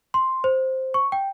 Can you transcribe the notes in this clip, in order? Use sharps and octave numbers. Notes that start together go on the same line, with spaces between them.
C6
C5
C#6
G5